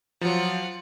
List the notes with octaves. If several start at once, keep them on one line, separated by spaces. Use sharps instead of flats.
F3 F#3 F4 F#5